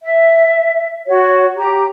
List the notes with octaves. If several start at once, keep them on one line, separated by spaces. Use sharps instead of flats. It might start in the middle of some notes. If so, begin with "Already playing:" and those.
E5
F#4 C#5
G4 A#5